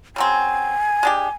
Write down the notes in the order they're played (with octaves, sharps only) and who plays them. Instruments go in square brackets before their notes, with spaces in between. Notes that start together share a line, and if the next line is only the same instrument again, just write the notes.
[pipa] C#3 F#3 C4 [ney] G#5
[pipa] G#3 D4 G4